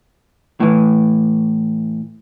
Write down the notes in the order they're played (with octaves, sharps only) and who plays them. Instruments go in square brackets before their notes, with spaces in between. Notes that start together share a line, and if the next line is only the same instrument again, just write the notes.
[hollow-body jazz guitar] A2 E3